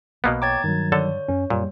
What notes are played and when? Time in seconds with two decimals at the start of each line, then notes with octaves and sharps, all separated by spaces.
0.24 B1 B2 A#3 B3
0.42 C#5 G5 A#5 D6 G#6 A6
0.64 G2 D#3 F#3
0.92 D3 A4 C#5 A5
1.28 F#2 C#4
1.50 F#2 A#2 G3 A#3